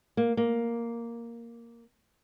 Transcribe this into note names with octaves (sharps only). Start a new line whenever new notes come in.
A#3
A#3